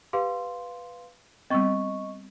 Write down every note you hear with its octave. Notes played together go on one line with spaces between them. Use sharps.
G4 B4 F5 C6
G3 B3 C4 D#5 C#6